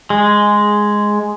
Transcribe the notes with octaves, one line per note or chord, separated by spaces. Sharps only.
G#3